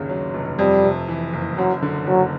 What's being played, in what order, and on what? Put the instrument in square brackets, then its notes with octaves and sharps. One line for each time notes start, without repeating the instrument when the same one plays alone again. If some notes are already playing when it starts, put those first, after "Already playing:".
Already playing: [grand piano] G1 D#2 C#3
F#3
F1
[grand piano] F2 [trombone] G3
[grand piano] C3
E3
F#1
[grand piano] F#2 [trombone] F#3
[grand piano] D3
[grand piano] F#1 [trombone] F#3